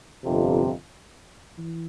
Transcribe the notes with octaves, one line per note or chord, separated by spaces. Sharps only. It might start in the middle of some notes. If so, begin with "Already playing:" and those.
G1 F2 C3
E3